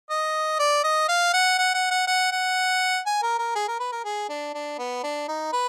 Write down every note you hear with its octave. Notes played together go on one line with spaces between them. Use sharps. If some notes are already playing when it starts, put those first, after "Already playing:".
D#5
D5
D#5
F5
F#5
F#5
F#5
F#5
F#5
F#5
G#5
A#4
A#4
G#4
A#4
B4
A#4
G#4
D4
D4
B3
D4
D#4
B4